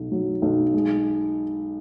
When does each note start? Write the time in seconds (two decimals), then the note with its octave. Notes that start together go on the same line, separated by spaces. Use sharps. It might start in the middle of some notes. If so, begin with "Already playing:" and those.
Already playing: B1
0.12 F#3
0.42 B1
0.74 G#3